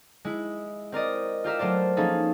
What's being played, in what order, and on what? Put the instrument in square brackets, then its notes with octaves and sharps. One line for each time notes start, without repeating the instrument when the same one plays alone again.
[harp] G#3 E4
C4 A#4 D5 D#5
F4 G4 A#4 E5
F#3 A3 A#4 C5 D5
F3 A#3 C#4 D#4 G#4 A4